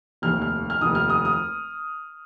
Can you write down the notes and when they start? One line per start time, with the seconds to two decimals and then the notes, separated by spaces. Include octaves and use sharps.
0.22 F1 D#2 D#3 F6
0.42 F6
0.70 F6
0.80 F1 D#2 D#3 D#6
0.95 F6
1.10 D#6
1.25 D#6